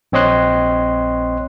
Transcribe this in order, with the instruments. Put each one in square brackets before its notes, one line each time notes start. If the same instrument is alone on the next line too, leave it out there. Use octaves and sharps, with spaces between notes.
[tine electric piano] A#1 C4 C#5 D#5 C6 F#6